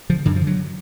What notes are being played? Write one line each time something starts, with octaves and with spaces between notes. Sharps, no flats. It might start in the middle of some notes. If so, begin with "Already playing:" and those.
D3 F3
F#2 D3
F3
D3
F#3